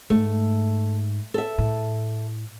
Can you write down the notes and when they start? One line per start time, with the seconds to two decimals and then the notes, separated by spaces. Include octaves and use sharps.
0.10 G#2 A3
1.34 A4 E5
1.58 A2